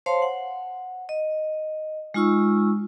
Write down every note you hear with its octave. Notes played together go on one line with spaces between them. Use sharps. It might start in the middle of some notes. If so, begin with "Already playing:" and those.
C5 C#5 F5 A5 C6
F#5
D#5
G#3 D#4 F4 C#6 E6